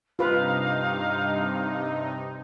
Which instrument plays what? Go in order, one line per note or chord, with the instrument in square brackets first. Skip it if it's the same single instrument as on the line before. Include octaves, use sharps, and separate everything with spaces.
[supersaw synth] G2 C3 D#4 [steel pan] F4 B4 [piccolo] F5